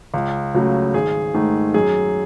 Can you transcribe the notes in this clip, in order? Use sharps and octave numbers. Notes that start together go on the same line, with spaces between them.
C#2
C#3 F#3 A3
G#1 G#4
G#2 D#3 A3
F#2 G#4